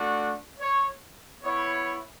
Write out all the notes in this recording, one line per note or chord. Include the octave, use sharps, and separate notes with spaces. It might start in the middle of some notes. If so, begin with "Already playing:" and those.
Already playing: A3 D4 F#4
C#5
B3 E4 C#5